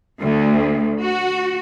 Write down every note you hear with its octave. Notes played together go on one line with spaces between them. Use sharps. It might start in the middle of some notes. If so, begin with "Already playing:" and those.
D2
F#4